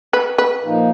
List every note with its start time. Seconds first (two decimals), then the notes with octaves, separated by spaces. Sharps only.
0.13 B4
0.38 B4
0.63 A#2 F3 A#3 D#4